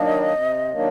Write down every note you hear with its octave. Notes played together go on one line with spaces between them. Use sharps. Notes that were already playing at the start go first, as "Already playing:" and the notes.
Already playing: D#3 F#3 A#3 D4 D#5
C3
D#3 F#3 A#3 D4